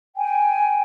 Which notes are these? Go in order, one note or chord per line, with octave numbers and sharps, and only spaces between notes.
G5 G#5